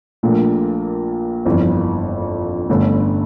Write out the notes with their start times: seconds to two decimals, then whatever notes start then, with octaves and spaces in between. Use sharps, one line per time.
0.23 A#1 A#2 A3
1.45 G1 F2 E3
2.69 G1 G2 D3 A3 C#4